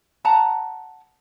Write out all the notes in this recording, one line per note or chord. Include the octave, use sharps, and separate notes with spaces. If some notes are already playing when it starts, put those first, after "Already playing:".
F#5 A5 A#5